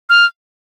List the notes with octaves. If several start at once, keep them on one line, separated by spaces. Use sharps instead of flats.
F6